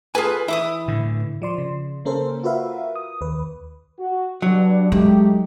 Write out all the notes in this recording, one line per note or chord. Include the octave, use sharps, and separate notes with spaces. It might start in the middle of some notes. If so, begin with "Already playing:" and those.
F4 G#4 A4 B4 G#5
E3 E4 E5 D6 D#6
A2 D3
F3 D5 C6
C#3
C#3 A#3 C#4 A4 A#4 C5
F4 F#4 A#4 B4 E5 F5
D#6
D#2 B4
F#4
G2 F#3 D4
G#3 A3 D#4 G4